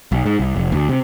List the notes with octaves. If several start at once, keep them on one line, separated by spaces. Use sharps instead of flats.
B1
G#2
C2
F1
D2
C3